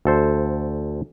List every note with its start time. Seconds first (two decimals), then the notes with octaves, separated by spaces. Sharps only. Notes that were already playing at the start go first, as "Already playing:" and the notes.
0.05 D2 A4 C5